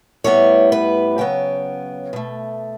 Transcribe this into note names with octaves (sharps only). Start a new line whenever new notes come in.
A2 G3 B3 C#5
B4
C#3 F#3 B3 G5
B2 A3